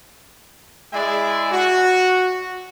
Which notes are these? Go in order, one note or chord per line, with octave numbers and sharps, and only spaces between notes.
G#3 E4 G#4 D5 E5 G#5
F#4